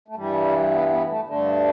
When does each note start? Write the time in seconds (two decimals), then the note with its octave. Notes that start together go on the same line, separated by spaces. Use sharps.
0.08 A3
0.15 G2 E3 G3
0.71 B3
0.90 B3
1.08 A3
1.26 G2 D3 A3